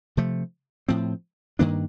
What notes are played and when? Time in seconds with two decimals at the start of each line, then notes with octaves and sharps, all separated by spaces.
0.17 C3 F3 A3
0.89 A2 F3 C4
1.59 G2 D#3 A#3 D4